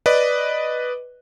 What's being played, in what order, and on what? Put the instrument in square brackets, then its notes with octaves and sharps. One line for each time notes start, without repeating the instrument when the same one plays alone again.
[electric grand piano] B4 D5 D#5